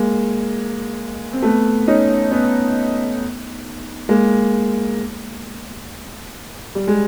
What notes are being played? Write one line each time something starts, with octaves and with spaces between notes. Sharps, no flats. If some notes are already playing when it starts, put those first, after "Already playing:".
Already playing: G#3 A#3
C4
A3 B3
C#4 D#4
B3 C#4
G#3 A#3
G3
G#3